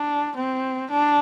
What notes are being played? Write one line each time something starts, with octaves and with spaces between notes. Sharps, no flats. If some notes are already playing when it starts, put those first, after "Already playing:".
Already playing: D4
C4
D4